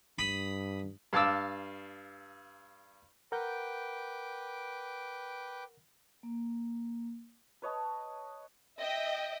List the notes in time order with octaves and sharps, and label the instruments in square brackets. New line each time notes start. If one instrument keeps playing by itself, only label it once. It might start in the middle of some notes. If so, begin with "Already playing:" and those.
[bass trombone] G2 [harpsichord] B5 D#6
[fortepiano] G2 F5 A5 D6 E6
[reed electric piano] A#4 F#5 G6 [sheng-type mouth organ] B4 G5 D6
[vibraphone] A#3
[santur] B4 C#5 D#5 A5
[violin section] D#5 E5 G5